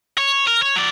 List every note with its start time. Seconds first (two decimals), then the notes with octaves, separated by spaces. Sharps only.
0.18 C#5
0.47 A#4
0.62 C#5
0.76 F#3 D5